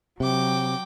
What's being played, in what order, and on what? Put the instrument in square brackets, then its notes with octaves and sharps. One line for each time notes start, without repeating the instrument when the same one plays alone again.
[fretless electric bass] C3 [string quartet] F#3 G5 D6